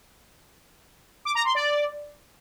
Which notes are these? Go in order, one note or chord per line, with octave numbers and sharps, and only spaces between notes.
D6
A#5
C6
D5